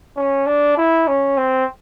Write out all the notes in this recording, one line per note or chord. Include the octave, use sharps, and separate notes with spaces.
C#4
D4
E4
C#4
C4